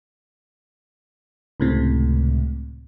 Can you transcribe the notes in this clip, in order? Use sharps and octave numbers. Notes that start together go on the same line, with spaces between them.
C#2 A2 C3